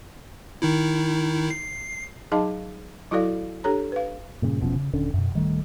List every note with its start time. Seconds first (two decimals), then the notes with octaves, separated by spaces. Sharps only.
0.62 D#3 D#4 E4
1.50 C7
2.32 F#3 D#4 G#4 D#5 F5 A5
3.11 F#3 E4 F#4 A4 D5 F5
3.64 D4 G4 A4 C#5 A#5
3.92 B4 F5
4.42 G2 A#2 C#3
4.61 E1 B2 F3 C#4
4.76 C#3
4.93 D#1 D3 C#4
5.14 F#2 B2
5.34 D1 D#3 G3 A3